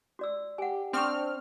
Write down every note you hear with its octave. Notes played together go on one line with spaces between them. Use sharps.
F#4 D5 E6
G4 F#5 G#5
C4 D4 A4 G5 C#6 F6